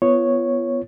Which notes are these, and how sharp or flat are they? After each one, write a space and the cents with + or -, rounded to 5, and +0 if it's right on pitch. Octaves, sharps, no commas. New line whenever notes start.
B3 +10 F4 -30 C#5 +0